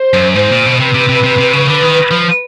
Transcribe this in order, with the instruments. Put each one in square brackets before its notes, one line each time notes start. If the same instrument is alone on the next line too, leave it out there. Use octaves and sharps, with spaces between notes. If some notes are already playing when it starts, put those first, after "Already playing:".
Already playing: [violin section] C5
[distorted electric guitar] F#2
[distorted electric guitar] G#2 [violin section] C5
[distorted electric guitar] A#2
B2
[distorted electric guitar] C3 [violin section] B4
[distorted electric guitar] C3
C3
C3
C3
C#3
[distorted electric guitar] D3 [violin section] B4
[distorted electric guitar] D#3
F3